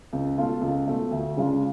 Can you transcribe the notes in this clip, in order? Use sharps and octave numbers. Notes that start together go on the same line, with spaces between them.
C#2
B2 A3 F4
C#2
B2 A3 F4
D2
C#3 G#3 D4 F4